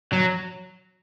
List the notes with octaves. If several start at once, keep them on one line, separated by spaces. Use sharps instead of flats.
F#3